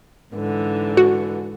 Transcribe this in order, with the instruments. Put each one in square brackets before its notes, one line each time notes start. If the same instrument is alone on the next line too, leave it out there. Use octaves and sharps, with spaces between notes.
[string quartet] G#2 D3 E3
[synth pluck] F#4